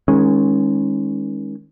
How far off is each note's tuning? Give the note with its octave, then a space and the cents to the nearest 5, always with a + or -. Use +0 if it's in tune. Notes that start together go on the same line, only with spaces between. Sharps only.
D#3 +20 G#3 +0 C#4 -15